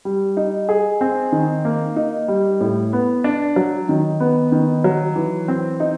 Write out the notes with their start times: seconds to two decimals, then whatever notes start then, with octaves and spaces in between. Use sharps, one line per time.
0.05 G3
0.37 D#4
0.69 G#4
1.01 C4
1.32 D#3
1.65 A#3
1.96 D#4
2.28 G3
2.61 A2
2.93 B3
3.24 D4
3.56 F#3
3.89 D#3
4.20 B3
4.52 D#3
4.84 F#3
5.16 E3
5.48 C4
5.80 D#4